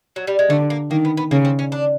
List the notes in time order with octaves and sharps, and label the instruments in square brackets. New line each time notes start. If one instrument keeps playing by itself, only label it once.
[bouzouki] F#3
G3
G#3
[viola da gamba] D3 [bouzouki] A3
[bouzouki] A#3
[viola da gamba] D#3 [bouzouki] A#3
[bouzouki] B3
B3
[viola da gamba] C#3 [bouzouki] A#3
[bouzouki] C4
C#4
D4